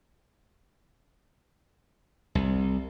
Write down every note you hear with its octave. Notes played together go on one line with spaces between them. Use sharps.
C2